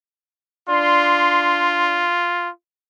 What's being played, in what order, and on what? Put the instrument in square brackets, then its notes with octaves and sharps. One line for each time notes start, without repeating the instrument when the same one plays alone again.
[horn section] D4 C6 [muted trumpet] F4